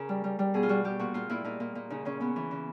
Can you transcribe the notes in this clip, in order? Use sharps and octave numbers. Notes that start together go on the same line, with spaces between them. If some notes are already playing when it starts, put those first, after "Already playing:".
Already playing: C#3 A#4
G3
G3
G3
B2 G#4
F4
G3 F#4
G3 G4
A#2 F#4
A#2 F4
A#2 E4
A#2 D#4
A#2
A#2
C#3 D#4
C#3 C#4
C#3 B3
E3
C#3